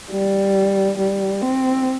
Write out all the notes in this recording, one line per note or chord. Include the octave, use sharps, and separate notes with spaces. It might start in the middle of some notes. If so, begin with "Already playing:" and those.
G3
G3
C4